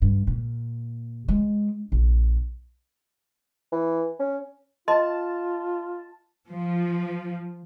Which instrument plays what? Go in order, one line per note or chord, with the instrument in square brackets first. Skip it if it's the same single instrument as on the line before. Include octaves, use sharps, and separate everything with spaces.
[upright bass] G2
A#2
G#3
A#1
[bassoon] E3
C#4
[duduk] F4 [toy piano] D#5 C6 [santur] A5
[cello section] F3